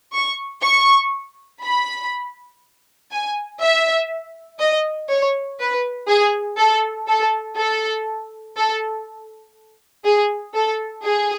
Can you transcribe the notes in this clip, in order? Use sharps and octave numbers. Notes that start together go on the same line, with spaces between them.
C#6
C#6
B5
G#5
E5
D#5
C#5
B4
G#4
A4
A4
A4
A4
G#4
A4
G#4